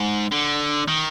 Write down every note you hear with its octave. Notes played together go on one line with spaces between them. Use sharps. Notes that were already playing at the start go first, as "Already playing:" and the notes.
Already playing: G#2
D3
D#3